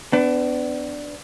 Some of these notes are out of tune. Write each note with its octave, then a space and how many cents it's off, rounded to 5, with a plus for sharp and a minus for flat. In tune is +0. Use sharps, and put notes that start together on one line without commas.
B3 +35 D4 +0